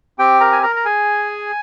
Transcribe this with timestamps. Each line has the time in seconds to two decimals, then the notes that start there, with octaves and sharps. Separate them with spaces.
0.19 C4 G4 G5
0.40 A#4 A#5
0.52 G#5
0.62 A#4 A#5
0.76 A#5
0.85 G#4 G#5